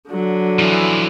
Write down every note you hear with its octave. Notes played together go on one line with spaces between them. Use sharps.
D3 F#3
E3 F3